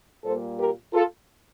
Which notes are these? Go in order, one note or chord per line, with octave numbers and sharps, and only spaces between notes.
A#2 G3 A#3 A4 C5
G4 A#4
F4 A4